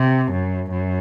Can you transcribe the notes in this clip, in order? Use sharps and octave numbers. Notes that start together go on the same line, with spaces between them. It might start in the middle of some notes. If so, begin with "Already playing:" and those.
Already playing: C3
F#2
F#2